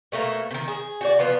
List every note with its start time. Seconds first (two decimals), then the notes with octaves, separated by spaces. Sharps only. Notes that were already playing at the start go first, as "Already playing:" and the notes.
0.12 B2 A3 A#3 A#5
0.51 C3 D#3
0.68 G#4
1.01 F#4 G4 D5
1.19 F3 B3 F4